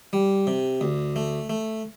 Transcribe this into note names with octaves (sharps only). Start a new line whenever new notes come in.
G3
C3
D2
A3
A3